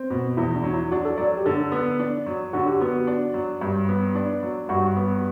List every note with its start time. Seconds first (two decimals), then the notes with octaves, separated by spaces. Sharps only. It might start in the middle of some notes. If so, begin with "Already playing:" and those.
Already playing: C4
0.10 B2
0.37 E2 E4
0.56 D4
0.64 F#3
0.73 E4
0.91 D4 F#4
1.05 A4
1.18 F#3 D5
1.37 G4
1.46 D3 A4
1.72 B3
1.99 D4
2.26 F#3
2.53 D3 F#4
2.66 G4
2.79 B3 F#4
3.07 D4
3.34 F#3
3.61 G2
3.89 B3
4.15 D4
4.43 F#3
4.69 G2 F#4
4.97 B3